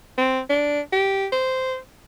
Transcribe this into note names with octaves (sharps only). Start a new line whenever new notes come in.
C4
D4
G4
C5